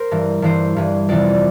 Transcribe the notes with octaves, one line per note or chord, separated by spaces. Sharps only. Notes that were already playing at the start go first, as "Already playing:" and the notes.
Already playing: A#4 C5
G2 E3
G2 E3 C5
G2 E3
F2 C3 E3 D5